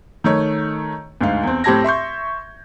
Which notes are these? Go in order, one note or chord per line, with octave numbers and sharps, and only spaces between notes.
D#3 A3 C#5
D2 G#2 F5
E2 C4
A2 C4 G4 A5 G#6 A#6
E5 C6 C#6 G6